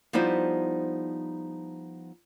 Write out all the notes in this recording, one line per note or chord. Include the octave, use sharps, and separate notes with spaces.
F3 G3 B3 D#4 E4 C5